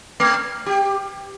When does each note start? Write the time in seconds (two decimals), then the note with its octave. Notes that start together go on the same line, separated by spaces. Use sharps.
0.20 A3
0.66 G4